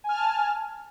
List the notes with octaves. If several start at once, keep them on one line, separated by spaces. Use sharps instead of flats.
G#5 A5 F6